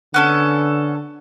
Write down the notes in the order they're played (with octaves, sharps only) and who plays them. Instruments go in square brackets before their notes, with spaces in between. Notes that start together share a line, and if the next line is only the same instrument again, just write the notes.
[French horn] D3 [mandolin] B3 C#4 A4